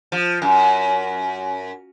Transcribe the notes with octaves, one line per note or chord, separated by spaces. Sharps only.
F3
F#2